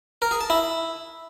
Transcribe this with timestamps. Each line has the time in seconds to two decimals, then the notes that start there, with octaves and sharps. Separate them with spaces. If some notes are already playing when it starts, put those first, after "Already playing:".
0.22 A#4
0.31 G#4
0.41 A5
0.50 E4